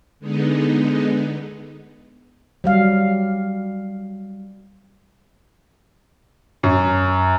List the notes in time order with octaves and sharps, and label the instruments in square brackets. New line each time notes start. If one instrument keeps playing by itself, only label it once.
[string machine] D3 G#3 B3 D#4
[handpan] F#3 G3 F5
[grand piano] F#2